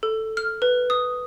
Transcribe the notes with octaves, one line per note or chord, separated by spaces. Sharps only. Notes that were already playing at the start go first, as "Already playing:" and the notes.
A4
F6
B4
D#6